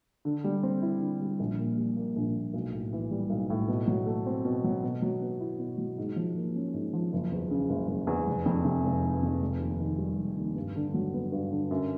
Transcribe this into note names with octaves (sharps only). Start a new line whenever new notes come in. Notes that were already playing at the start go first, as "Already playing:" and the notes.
D3
G3
C4
E4
D3
G3
A#1
A#2
G3
A#3
A#1
A#2
B1
A2
E3
G3
B1
A2
B2
F#3
A3
C4
B2
F#3
B2
F#3
B3
E4
B2
F#3
G#2
F3
A#3
C#4
G#2
F3
F#1
E2
C#3
F#1
F#1
E2
F1
F2
C3
F1
F1
F2
F1
D#2
D#3
G3
F1
D#2
G2
D3
F#3
B3
G2
D3
F#2